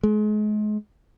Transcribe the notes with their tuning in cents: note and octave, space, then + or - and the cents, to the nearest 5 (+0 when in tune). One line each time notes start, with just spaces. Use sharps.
G#3 +35